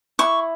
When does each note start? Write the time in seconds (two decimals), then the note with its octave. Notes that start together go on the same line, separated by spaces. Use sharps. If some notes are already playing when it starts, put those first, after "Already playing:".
0.19 E4 C#6